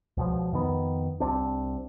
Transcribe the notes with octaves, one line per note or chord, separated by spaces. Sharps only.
C#2 B2 F3
F2 D#3 B3
C2 C4 D4